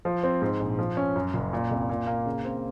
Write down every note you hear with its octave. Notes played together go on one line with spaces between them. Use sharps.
F3
C4
G#2
A#1
F3
C#4
F#2
F#1
A#2
C2
A#2
A#3
C#3
C4